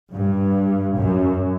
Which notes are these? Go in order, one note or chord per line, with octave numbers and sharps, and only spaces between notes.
G2
F#2